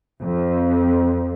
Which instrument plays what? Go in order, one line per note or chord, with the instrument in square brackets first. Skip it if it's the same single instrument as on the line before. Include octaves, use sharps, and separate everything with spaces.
[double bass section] F2